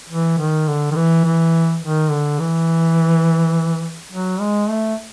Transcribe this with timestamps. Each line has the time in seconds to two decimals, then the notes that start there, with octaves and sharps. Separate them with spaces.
0.09 E3
0.38 D#3
0.67 D3
0.91 D#3
0.95 E3
1.24 E3
1.81 D#3
2.10 D3
2.39 E3
4.12 F#3
4.40 G#3
4.69 A3